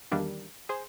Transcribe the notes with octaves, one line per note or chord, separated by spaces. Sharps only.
E2 D#3 G3 A#3 D4
G#4 C5